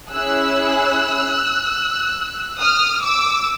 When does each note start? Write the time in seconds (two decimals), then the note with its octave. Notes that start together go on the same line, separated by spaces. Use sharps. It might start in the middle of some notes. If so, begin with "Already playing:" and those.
0.13 C#4 E4 G#4 E6 F#6
2.60 D#6 F6
3.02 D6 E6